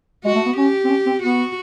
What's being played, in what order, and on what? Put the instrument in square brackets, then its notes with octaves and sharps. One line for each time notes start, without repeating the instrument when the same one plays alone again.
[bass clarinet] G#3 [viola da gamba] F#4
[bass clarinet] A3
B3
[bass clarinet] C#4 [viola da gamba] G4
[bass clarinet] C4
C#4
C4
[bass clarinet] B3 [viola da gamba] F#4